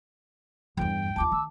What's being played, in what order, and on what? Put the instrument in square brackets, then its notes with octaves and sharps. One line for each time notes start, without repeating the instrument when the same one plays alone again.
[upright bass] E2 G2 [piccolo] G5
[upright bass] D#2 F4 [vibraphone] A5 D6
[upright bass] D#3 [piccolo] E6